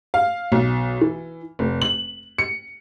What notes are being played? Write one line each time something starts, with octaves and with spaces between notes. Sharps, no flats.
F5
B1
E3
F1
F#7
C#7